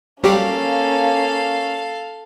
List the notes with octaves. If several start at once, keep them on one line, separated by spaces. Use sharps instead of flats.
F#3 G3 A#3 C#4 G4 A4 F5